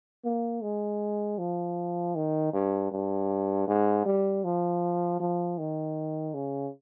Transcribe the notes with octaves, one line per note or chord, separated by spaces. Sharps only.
A#3
G#3
F3
D#3
G2
G2
G#2
G3
F3
F3
D#3
C#3